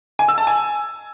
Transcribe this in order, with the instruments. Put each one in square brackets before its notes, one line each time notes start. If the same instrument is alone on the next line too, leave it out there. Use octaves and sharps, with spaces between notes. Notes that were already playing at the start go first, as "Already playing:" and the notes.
[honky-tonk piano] G#5
E6
A5
G#5